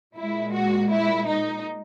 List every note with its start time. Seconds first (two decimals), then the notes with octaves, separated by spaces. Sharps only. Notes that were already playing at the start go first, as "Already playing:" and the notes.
0.16 A#2 G#3 E4
0.53 F#4
0.91 E4
1.27 D#4